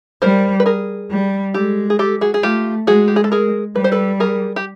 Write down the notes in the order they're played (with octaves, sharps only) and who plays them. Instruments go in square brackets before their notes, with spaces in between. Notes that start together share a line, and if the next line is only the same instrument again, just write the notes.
[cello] G3 [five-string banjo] A#4 C5
[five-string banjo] B4
G#4 A#4
[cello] G3
[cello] G#3 [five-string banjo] G4 A4
[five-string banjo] G#4
G4 A4
F#4 G#4
G#4
[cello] A3 [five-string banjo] F4 G4
[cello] G#3 [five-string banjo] F#4 G#4
[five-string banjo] G4
G#4
A4
G#4 A#4
[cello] G3 [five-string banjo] B4
[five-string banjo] C5
A4 B4
G#4 A#4
G4